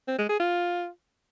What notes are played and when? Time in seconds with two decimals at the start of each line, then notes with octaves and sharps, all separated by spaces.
0.08 C4
0.18 G#3
0.29 G#4
0.40 F4